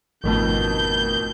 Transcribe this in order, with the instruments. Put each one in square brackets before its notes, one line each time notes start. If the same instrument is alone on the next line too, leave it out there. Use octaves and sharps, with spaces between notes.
[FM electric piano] G#1 A3 [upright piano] F2 B2 D#3 [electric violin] G6